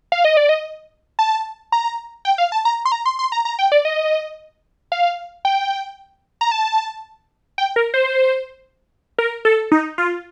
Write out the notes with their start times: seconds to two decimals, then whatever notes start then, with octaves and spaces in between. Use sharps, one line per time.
0.12 F5
0.25 D#5
0.37 D5
0.49 D#5
1.19 A5
1.72 A#5
2.25 G5
2.38 F5
2.52 A5
2.65 A#5
2.85 C6
2.92 A#5
3.06 C6
3.19 C6
3.32 A#5
3.45 A#5
3.59 G5
3.72 D5
3.85 D#5
4.92 F5
5.45 G5
6.41 A#5
6.51 A5
7.58 G5
7.76 A#4
7.94 C5
9.18 A#4
9.45 A4
9.72 D#4
9.98 F4